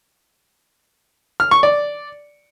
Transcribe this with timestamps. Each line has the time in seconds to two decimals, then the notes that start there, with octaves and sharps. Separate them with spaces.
1.40 F6
1.51 C#6
1.63 D5